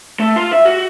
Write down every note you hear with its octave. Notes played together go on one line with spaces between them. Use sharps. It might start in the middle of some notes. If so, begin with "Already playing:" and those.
A3
F4
E5
F#4